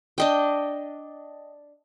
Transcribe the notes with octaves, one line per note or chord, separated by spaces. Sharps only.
D4 D#5 G5